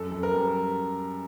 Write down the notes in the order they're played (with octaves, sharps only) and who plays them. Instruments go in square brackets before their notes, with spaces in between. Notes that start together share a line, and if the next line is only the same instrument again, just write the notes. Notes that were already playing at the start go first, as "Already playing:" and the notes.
Already playing: [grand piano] F#2 A4
F#2
A#4
G3